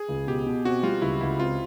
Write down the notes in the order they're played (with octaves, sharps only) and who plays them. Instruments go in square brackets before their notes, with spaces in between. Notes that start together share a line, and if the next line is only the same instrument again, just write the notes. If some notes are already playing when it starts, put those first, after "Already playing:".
Already playing: [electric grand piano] G#4
[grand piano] C#2
[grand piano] B2 [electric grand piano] G4
[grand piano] B2
[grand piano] C4 [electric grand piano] F#4
[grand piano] G3 [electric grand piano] F4
[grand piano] C#2 [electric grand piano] E4
[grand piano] C#2 [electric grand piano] E4
[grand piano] C4 [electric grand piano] F4